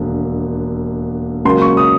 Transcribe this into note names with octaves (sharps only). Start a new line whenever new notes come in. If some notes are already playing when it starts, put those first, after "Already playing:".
Already playing: E1 D#2 D3
C#2 C#3 F#3 A#3 C6
C#6
D#6